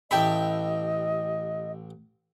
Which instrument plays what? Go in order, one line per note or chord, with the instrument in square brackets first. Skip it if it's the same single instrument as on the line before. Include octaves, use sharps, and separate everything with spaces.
[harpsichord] A1 G4 E5 [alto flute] D#5 [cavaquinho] G5 A5 B5